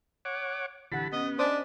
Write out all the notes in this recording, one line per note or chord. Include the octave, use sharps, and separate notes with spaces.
C#5 F#5 D6
A#1 D3 E3 G4 F#5 A5 B5
B3 C#4 D#5
D4 C5 D#5 G#5 D6 D#6 B6